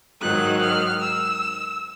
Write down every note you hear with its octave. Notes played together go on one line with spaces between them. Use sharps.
G#2 D#3 F#3 F#6
F6
E6